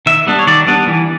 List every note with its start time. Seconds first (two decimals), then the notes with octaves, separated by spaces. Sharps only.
0.06 D#3 E5
0.27 G3 B3 D4
0.39 C#5
0.47 D#3 D5
0.67 G3 B3 D4
0.87 E3